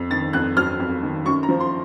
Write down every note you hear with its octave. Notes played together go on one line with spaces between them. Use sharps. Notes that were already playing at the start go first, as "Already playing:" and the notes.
Already playing: F2
D#3 A6
F2 F#6
F#3 F6
F2
D#3
F#2 C#6
A#5
F3
C6